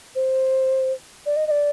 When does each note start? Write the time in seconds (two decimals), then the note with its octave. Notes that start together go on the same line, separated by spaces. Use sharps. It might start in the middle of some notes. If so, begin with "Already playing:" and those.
0.15 C5
1.26 D5
1.36 D#5
1.47 D#5
1.51 D5